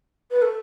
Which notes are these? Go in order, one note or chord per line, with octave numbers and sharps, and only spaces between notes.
B4
A4